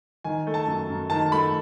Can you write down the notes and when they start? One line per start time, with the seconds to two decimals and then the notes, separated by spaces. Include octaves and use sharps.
0.24 D#3 G#5
0.47 A3
0.54 A5
0.67 F#2
0.89 F#2
1.10 D#3 A5
1.32 A3 B5